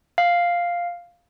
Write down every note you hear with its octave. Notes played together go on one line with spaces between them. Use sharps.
F5